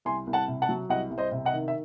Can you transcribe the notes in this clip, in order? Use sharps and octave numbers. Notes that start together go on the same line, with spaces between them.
C2 G#5 C6
C2
F#5 A5
C3
F#5 A5
F#3
C2 D#5 F#5
C2
C5 D#5
C3
D#5 F#5
D#3
E5